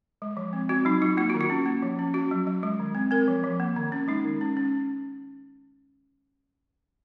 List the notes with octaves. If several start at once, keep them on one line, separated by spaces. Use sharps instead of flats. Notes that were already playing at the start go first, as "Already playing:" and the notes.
G#3
F3
C4
C4 F#4
F#3 D#4
F#3 F4
A#3 F4
D#3 F#4
F4
C#4
A#3
F3
C#4
C#4 F#4
F#3
F#3
G#3
D#3
C4
C4 A#4
F3
F3
A#3
D#3
C#4
G#3 D#4
D#3
C#4
C#4